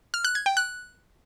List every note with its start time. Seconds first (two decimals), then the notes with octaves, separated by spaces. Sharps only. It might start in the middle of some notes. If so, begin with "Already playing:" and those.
0.14 F6
0.24 F#6
0.35 G#6
0.46 G5
0.57 F#6